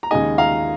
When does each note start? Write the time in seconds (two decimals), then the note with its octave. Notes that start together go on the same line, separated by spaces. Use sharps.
0.03 A#5
0.11 D#2 C#3 G#3 D#4 D#5 G#5
0.38 F5 A#5